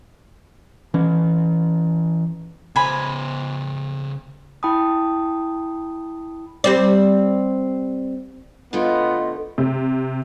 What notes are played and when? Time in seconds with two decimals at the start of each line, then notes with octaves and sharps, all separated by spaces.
0.94 E3 C#4
2.76 C#3 C5 G#5 B5
4.63 E4 G5 A5 B5 D#6
6.64 G3 C4 D5
8.73 D3 A3 B3 F4 D#5
9.58 C3